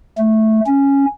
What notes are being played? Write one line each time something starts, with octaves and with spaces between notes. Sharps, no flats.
A3
C#4